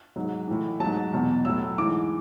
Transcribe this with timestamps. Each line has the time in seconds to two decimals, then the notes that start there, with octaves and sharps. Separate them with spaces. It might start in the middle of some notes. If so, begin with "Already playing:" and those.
0.16 G#2 F#3
0.48 A2 E3
0.80 G#2 F#3 A5
1.13 E2 B2 F#3
1.45 A2 F#3 E6
1.78 G#2 E3 D6